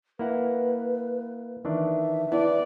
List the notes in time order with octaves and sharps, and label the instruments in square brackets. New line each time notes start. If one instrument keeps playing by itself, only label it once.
[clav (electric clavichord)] A#3 E4 F#5 [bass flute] B4
[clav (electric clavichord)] D#3 E3 D4 [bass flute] E5
[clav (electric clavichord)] B3 [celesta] E4 [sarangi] D5